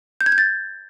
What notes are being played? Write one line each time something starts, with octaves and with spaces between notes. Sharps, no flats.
G6
G#6
G6
A6